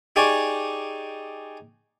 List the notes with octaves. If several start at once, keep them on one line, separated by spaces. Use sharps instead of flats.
D#4 G4 G#4 D5 G#5 C#6